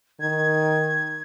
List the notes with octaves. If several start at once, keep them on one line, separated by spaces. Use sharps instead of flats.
D#3 G#6